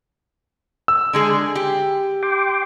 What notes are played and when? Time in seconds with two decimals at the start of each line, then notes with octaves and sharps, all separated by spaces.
0.88 E6
1.13 D3 G#3 G#4
1.55 G4
2.23 G5 C6 D6